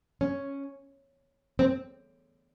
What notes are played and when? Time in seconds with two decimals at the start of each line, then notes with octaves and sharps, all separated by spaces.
0.21 C#4
1.59 C4